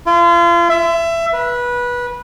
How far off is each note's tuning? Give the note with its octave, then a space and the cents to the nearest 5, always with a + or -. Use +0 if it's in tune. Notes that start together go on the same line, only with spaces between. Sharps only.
F4 -35
E5 +20
B4 -20